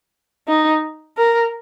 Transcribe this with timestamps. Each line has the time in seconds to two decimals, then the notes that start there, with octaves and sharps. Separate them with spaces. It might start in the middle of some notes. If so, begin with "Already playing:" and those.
0.48 D#4
1.18 A#4